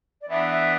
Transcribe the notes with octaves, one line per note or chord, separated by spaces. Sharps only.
D5
E3 B3 D4 E5
E5